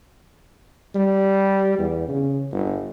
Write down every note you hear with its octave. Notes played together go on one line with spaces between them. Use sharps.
G3
E2
C#3
G1